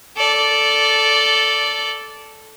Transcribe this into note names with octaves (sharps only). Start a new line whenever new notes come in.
A4 D5